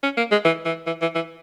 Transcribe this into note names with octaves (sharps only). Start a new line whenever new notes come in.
C#4
A#3
G#3
E3
E3
E3
E3
E3